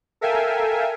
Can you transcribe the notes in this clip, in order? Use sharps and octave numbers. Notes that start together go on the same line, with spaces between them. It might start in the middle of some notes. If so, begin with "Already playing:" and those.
A4 A#4 E5 F5 G5 G#5